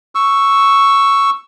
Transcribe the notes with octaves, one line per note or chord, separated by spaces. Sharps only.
C#6 E6